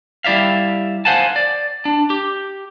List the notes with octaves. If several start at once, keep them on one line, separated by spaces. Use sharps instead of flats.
G3 E4 D5 E5 F5
C5 F5 F#5 G#5 A5
D5
D4
G4